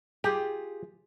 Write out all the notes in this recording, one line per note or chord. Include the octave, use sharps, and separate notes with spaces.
F4 G4 G#4